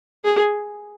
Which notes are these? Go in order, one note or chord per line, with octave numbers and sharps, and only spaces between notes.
G#4